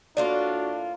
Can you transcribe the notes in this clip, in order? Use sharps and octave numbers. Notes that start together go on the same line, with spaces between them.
A2 A#3 D4 F4 F#4 D5